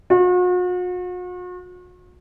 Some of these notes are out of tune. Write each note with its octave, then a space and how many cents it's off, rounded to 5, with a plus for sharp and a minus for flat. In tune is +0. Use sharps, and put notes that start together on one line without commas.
F#4 -45